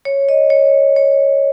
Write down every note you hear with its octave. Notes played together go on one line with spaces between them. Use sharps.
C#5
D#5
C#5
C#5